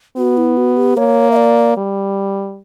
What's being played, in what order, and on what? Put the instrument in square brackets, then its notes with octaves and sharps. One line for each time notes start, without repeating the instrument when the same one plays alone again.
[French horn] B3 [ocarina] F#4
[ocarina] E4
F#4
G4
[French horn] A#3 [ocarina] C#5
[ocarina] E5
D5
[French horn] G3